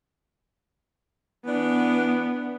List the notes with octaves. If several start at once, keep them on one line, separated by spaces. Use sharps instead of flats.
E3 B3 D4